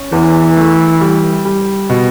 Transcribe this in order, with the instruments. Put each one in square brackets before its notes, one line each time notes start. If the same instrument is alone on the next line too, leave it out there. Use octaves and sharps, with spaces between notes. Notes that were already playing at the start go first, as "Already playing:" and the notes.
Already playing: [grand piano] C#4
[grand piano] E2 [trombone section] E3
[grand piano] A3
G3
G3
B2